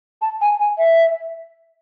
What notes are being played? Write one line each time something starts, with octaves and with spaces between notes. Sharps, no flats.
A5
G#5
G#5
E5